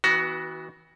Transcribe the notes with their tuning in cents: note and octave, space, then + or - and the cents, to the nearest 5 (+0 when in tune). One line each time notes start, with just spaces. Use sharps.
E3 -35 B3 +0 F#4 +15